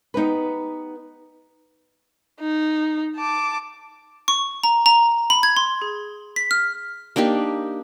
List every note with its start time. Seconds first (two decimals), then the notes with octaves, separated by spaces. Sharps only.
0.14 B3 D#4 G4 B4
2.40 D#4
3.17 A5 D6
4.28 C#6
4.64 A#5
4.86 A#5
5.30 B5
5.43 G#6
5.57 C6
5.82 G#4
6.36 B6
6.51 F6
7.16 A#3 D4 D#4 G4